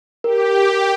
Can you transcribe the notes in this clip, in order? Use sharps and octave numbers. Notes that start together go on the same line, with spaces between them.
G4 A#4